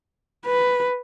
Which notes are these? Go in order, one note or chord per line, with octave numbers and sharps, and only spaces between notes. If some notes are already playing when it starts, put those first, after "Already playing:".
B4